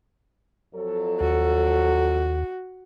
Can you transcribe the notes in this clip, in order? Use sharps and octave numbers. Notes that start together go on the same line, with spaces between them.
F2 F#3 A4
D#2 F#4